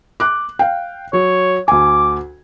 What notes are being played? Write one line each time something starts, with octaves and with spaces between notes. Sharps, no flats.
D6 F#6
F5 G5
F#3 C#5
D2 G#5 D6